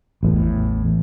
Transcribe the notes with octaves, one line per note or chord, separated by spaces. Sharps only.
A1 E2 A2